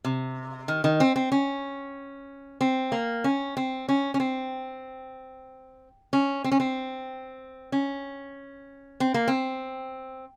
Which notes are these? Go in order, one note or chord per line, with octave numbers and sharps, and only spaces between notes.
C3
D#3
D#3
C4
C4
C#4
C4
A#3
C#4
C4
C#4
C#4
C4
C#4
C4
C#4
C4
C#4
C4
A#3
C4